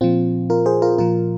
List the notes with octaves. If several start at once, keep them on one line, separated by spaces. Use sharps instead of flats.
A#2 F3 C4 F4
F4 A#4
G#4 C5
F4 A#4
A#2 F3 F4 A#4